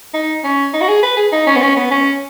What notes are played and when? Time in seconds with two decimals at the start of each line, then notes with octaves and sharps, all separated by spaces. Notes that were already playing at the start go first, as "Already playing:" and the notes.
0.14 D#4
0.44 C#4
0.73 D#4
0.81 F#4
0.88 G#4
1.03 B4
1.17 G#4
1.32 D#4
1.47 C#4
1.56 B3
1.62 C#4
1.77 B3
1.91 C#4